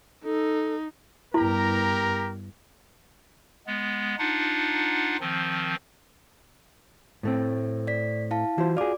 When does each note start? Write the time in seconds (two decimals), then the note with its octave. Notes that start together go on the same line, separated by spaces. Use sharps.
0.24 D#4 A4
1.34 G2 B3 E4 G4 A#4 A#5
3.67 G#3 B3
4.19 D4 D#4 F4 F#5
5.21 D#3 F3 C4
7.23 A2 A3 C4
7.87 D5 B6
8.31 E4 F5 A5
8.58 E3 F4 F#4 C5
8.77 F4 G#4 D5 D6